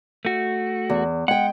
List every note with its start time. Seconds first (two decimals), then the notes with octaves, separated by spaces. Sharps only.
0.25 A3 F#4
0.90 E2
1.28 G#3 F#5 G5